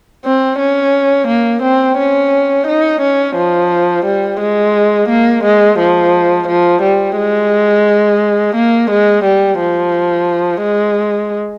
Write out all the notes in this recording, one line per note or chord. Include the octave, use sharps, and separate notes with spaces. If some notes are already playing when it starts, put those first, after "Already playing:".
C4
C#4
A#3
C4
C#4
D#4
C#4
F3
G3
G#3
A#3
G#3
F3
F3
G3
G#3
A#3
G#3
G3
F3
G#3